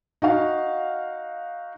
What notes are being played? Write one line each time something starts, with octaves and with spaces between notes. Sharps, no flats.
D#4 F#4 F5 F#5